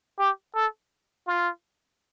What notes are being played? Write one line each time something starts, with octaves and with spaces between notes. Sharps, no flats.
G4
A4
F4